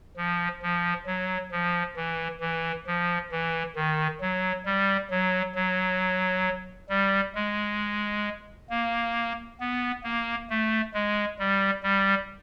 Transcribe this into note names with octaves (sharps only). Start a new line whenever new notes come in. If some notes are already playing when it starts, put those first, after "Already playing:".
F3
F3
F#3
F3
E3
E3
F3
E3
D#3
F#3
G3
F#3
F#3
G3
G#3
A#3
B3
A#3
A3
G#3
G3
G3